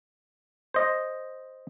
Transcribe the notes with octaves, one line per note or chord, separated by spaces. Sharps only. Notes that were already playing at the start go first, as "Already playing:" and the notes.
C5 D#5